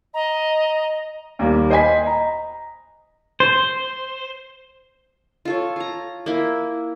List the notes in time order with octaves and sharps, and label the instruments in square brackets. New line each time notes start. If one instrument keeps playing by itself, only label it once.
[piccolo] D#5 [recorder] A#5
[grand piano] D#2 G3 A#3
C5 D#5 G5 G#5 B5 B6
D#5 A#5
[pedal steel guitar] C5
[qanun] F4 A4 C#5
F4 A#5
A#3 E4